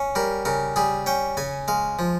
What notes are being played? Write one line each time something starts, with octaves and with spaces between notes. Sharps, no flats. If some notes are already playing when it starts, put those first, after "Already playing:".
Already playing: C#4
G3 A#4
C#3 A#4
G3 G#4
C#4 G5
C#3 G#5
G#3 F5
F3